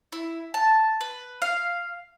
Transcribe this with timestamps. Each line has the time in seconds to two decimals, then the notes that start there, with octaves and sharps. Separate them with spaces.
0.12 E4
0.54 A5
1.01 B4
1.42 F5